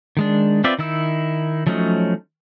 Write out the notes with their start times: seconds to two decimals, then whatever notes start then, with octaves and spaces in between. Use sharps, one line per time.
0.17 D#3 G#3 D4
0.64 C4 F4 B4 D5 E5
0.79 D#3 D#4 E4 E6
1.67 F3 F#3 A3 C#4 D#4